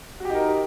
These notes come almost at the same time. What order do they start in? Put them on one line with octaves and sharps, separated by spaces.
F#4 G4 D#4 A#4